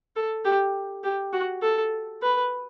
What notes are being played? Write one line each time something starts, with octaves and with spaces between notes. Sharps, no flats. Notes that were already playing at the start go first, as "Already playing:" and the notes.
A4
G4
G4
F#4
A4
B4